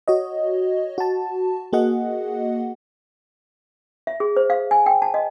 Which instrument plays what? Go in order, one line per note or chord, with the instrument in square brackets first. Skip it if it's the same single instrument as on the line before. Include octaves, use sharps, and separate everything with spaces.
[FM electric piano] F#4 C#5 D#5
F#4 A5
A#3 F#4 G#4 D#5 F#5
[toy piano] E5
G#4
C5
F5
G#5
G5
A5
D#5